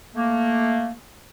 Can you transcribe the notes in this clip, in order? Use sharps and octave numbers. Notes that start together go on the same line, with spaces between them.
A3 A#3